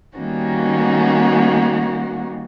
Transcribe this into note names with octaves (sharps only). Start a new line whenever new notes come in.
D#3 G3 A#3 B3 C#4 F#4